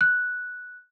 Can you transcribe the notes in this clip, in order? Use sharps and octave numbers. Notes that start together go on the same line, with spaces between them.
F#6